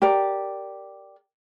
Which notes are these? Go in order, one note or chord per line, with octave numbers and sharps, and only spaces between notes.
G4 A#4 D5